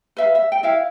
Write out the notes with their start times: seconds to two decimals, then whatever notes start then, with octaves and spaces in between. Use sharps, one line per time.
0.17 B4 E5 F5
0.35 E5
0.52 G5
0.63 E4 E5 F5